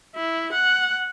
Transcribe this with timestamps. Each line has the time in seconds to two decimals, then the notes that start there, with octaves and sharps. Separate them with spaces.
0.15 E4
0.53 F#5